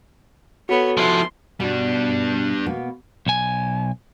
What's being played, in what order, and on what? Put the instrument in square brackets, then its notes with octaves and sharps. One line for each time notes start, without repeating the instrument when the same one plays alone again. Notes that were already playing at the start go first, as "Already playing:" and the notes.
[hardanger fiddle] B3 C#5 [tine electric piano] F#4 A4
[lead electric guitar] F3 E4 [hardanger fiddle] C6
[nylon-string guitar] B2 [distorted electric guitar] G3 D4
[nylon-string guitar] B2 A#3 B3
[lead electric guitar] B1 G#5